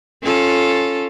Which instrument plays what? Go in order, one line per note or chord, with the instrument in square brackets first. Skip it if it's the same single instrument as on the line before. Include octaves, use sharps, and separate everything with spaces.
[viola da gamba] C#4 F4 A4